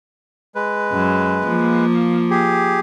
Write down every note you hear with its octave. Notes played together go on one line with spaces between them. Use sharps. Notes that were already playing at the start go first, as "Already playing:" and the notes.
G#3 B4
F#2
F3 A#3
G4 G#4